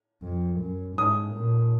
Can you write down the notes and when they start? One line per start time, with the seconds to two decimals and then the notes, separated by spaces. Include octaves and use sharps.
0.23 F2
0.60 F#2
0.97 G#2 D#6
1.35 A#2